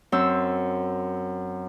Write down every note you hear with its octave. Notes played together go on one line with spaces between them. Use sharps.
F#2 C4 E6